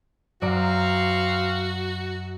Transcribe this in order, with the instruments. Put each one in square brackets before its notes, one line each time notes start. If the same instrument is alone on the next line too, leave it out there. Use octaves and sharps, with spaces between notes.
[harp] F#2 D5 A#5 [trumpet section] C4 F5 [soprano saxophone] F#4